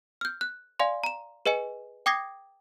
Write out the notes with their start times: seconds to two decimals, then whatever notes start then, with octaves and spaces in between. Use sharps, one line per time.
0.21 F6 G6
0.41 F#6
0.79 D5 F5 G#5 C6
1.04 A#5 E7
1.46 G#4 B4 D#5 G#5 C#7
2.06 G5 D6 D#6 G#6 A#6 C7